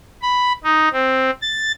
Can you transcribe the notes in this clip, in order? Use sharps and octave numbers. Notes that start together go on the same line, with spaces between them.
B5
D#4
C4
A6